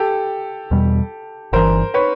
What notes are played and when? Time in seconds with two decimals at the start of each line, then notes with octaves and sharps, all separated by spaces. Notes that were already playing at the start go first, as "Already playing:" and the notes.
Already playing: G4 A4
0.71 E2 B2 G3
1.53 G1 G2 E3 A#4 C5
1.94 B4 C#5